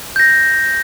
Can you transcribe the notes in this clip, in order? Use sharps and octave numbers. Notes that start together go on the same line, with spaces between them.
G6 A#6